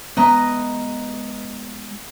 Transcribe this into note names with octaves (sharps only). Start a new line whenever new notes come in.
G#3 B3 B4 D#5 A#5